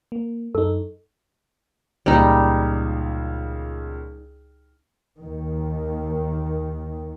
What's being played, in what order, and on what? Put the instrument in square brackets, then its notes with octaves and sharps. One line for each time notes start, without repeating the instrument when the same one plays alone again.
[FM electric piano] A#3
[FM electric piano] F#2 D#4 [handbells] A4
[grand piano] C#2 A#2 C#3 [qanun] G3 D#4
[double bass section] D#2 D#3